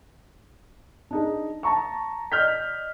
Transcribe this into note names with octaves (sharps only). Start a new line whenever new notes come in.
D4 D#4 G#4
A5 A#5 C#6
D5 D#5 F6 G6 B6